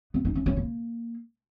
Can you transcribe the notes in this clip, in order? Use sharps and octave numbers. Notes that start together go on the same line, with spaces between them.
B3
D#4
C#4
C#4
A#3